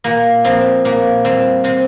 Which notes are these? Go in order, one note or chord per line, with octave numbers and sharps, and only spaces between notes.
A#2 A#3
F3 A#3 C4
A#2 A#3
G3 A#3 C4
C3 C4